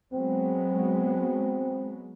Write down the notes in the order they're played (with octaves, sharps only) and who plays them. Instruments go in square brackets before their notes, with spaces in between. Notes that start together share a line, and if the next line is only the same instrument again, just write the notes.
[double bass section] F#3 G#3 B3 [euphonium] C4